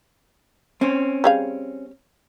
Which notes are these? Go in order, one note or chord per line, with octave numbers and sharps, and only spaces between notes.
C4 C#4
G3 G#4 F5